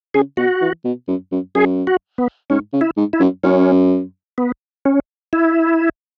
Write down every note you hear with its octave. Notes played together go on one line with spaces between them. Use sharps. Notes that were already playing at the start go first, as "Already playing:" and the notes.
C#3 G#4
B2 F#4
E3
B2
F#2
F#2
F#2 G#4
F#4
B3
G#2 C#4
C#3
E4
G#2
E4
F#2
F#2 C#4
B3
C#4
E4